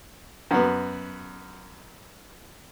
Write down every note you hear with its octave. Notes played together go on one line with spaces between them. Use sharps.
F#2 B3